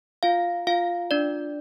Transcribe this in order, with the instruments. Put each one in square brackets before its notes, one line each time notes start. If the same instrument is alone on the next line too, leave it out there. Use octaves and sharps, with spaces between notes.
[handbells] F4 F5
F4 F5
D4 D5